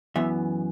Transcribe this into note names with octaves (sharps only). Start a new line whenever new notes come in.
F#2 E3 B3 E5